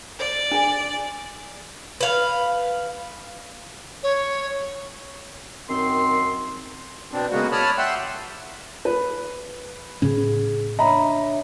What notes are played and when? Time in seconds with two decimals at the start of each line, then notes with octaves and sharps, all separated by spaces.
0.19 D5
0.51 D4 G#4 G#5
2.00 B4 F5
4.03 C#5
5.69 F#2 D#3 C4 C6
7.12 B2 C4 D4
7.32 C#3 G#3 A#3 B3 F#4
7.52 C#5 D5 A5 B5 D#6 F6
7.78 E5 F#5 G5 C6 E6 F#6
8.85 B4
10.02 A2 C#3 C#4 G#4
10.79 D4 C#5 D#5 E5 A#5 B5